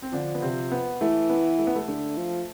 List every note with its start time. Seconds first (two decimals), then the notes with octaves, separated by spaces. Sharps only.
0.02 C4
0.13 D3 F3 D4
0.35 B3
0.42 C3 C4
0.72 B3
1.01 E3 A3
1.30 B3
1.59 A3
1.67 B3
1.76 A3
1.88 D3 A3
2.17 F3